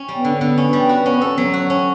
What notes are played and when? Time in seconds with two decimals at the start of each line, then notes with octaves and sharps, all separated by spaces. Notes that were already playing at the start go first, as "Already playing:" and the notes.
Already playing: C#4
0.08 G3
0.17 B3
0.25 D3
0.41 D3 B3
0.57 C#4
0.73 G3
0.89 F#4
1.06 C#4
1.21 A4
1.38 F#3
1.54 F#4
1.70 C#4